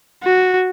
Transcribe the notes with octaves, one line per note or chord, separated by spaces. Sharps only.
F#4